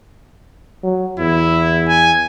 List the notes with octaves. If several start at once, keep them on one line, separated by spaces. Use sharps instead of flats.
F#3
E2 E4
G#5